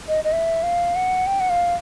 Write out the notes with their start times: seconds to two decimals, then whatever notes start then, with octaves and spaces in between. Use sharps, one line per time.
0.08 D#5
0.24 D#5
0.32 E5
0.63 F5
0.96 F#5
1.27 G5
1.40 F#5
1.50 F5